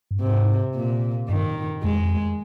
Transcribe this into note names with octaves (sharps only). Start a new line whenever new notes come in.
G2
G#2 C3
A#2
G2 D#3
F2 G#3